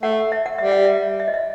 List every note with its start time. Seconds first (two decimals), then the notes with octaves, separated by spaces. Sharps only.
0.03 A3 F#5
0.32 E5
0.46 F#5
0.58 G3 E5
0.72 F#5
0.85 E5
1.20 E5
1.28 D#5
1.34 E5